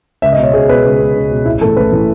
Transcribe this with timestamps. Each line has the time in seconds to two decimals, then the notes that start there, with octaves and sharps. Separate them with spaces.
0.22 C#2 E5
0.32 D#5
0.37 B2
0.43 C#5
0.53 C#2 G#4
0.69 B2 B4
0.84 C#2
0.99 B2
1.16 C#2
1.31 B2
1.46 A1 E4
1.61 E3 A4
1.65 A2
1.77 A1 B4
1.92 A2 E3